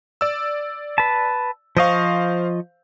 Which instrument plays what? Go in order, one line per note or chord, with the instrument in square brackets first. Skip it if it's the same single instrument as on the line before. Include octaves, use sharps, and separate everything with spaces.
[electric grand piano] D5 E6
[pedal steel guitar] B4 A5
[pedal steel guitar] F3 D#5 C#6 [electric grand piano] C5 F5